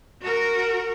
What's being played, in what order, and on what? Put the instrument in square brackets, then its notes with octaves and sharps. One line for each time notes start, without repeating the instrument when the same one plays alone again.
[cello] F#4 A#4